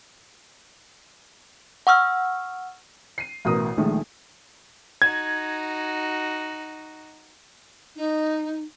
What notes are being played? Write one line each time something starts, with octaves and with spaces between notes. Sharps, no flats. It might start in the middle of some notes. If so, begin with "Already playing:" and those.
F#5 C#6 E6 F6
C7 D#7
A1 B2 A#4 D#6
A#1 D#3 G#3 A3
D#4 F#4 G#6
D#4